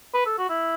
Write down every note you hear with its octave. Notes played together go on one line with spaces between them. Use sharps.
B4
A4
F#4
E4